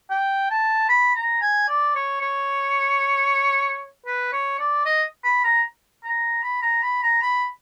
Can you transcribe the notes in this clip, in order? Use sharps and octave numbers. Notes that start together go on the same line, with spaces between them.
G5
A5
B5
A#5
G#5
D5
C#5
C#5
B4
C#5
D5
D#5
B5
A#5
A#5
B5
A#5
B5
A#5
B5